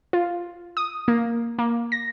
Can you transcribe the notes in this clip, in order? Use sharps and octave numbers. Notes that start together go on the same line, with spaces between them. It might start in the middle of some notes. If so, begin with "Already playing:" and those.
F4
D#6
A#3
A#3
A#6